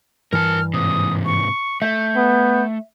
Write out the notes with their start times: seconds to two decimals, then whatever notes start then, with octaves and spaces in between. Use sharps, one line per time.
0.33 G2 E3 A#4 A5 F6
0.74 G#2 C3 D#6
1.25 C#6
1.82 A3 E5 G6
2.16 B3